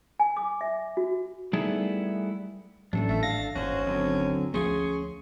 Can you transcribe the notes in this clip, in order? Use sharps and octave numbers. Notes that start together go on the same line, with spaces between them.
G#5
D6
E5
F#4
G3 A3 B3 D#4 E4 G#4
A1 F#3 G#3 A3 D4 A4
G#1 A3
F5 A#6
G1 D#2 C#4 F#4 C5
D3 F#3 C4
D2 F3 A3 C#4 G#4 C6 C#6